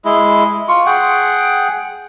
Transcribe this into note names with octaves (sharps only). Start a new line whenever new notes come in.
G#3 E4
F4 C#6
G#4 F#5 G5